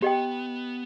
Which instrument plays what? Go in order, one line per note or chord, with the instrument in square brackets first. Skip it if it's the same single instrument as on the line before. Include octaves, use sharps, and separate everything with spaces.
[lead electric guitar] B3 [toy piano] G4 D#5 G5